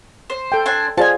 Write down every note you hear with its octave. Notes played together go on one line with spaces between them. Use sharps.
C5
A4 G5
D4 C5 G#5
F4 G#4 C5 D5 G#5 A5